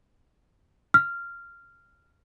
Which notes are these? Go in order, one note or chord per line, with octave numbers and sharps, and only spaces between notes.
F6